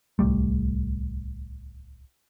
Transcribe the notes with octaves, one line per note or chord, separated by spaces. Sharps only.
D1 C2 G3 A3